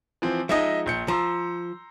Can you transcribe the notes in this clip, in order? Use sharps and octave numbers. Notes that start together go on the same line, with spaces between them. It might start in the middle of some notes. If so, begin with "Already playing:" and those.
E3 F3 C4
F3 G#3 D#4 D#5 E5
A#1 G6 C#7
F3 A#5 C6 E6